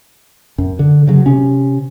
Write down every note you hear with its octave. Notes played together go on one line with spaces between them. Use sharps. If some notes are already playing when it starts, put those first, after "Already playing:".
F#2
D3
C#3 F#3
C3 C#4